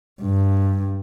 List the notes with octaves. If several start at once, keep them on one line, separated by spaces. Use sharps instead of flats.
G2